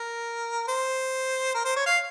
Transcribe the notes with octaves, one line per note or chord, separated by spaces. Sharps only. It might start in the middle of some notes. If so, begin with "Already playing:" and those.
Already playing: A#4
C5
A#4
C5
C#5
F5